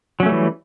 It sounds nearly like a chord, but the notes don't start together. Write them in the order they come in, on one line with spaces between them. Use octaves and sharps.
F#3 C#4 A3 G3 E3